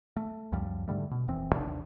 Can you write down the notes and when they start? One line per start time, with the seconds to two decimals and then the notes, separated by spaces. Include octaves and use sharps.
0.17 A3
0.52 C#2 F#2 F3 G3
0.88 G#2 D3 G3 A3
1.11 B2
1.28 D#1 F2 E3 C4
1.51 A1 D#2 C3 D4